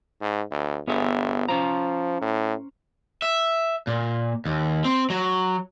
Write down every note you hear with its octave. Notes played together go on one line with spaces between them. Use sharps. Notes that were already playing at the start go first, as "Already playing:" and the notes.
G#2
D2
G1 B3 G#4 E5
F3 C#4 C5 A#5
A2
E5
A#2
D#2
C4
F#3